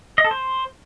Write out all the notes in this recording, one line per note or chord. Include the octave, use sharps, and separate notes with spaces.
D#5
A4
C5